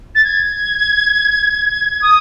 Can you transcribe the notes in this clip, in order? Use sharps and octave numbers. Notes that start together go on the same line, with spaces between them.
A6
G#6
D#6